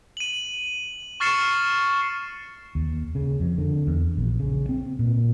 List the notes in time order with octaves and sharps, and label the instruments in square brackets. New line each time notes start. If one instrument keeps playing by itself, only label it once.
[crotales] D#7 F#7
C#6 F6 A6 C7 C#7 E7
[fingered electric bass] D#2
C#3
F2
D3
E2
A#1
C#3
C4
A#2